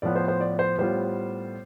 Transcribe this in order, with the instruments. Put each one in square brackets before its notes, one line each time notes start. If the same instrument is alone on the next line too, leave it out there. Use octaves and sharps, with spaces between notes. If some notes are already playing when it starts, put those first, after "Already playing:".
[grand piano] A2 F3 B3 D5
C5
C5
D5
C5
A2 G3 B3 F4 C5